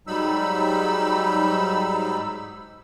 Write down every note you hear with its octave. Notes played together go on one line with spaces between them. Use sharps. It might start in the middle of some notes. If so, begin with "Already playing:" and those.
G#2 F#3 G3 D#4 B5 E6